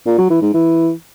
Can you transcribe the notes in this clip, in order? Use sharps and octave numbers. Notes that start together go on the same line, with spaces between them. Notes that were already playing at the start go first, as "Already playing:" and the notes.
A#2
F#3
E3
G#2
E3